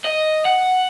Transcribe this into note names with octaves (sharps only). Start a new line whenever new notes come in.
D#5
F#5